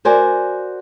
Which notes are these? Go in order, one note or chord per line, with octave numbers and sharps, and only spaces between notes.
F#4 A#4 C5 D5 G#5